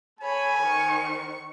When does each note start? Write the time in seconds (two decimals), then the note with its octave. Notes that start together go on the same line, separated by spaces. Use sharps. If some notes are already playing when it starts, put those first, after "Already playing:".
0.21 A4 C#5 G#5 B5
0.61 D#3 C5 C#6